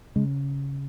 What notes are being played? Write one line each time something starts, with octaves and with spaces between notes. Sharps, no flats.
C#3 G#3